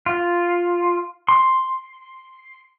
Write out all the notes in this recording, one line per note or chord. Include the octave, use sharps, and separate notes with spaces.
F4
C6